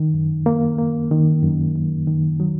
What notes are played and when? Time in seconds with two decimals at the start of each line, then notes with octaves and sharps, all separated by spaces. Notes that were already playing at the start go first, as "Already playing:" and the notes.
Already playing: D#3
0.14 F#2
0.46 A#3
0.78 A#3
1.11 D#3
1.43 F#2
1.75 F#2
2.07 D#3
2.40 F#3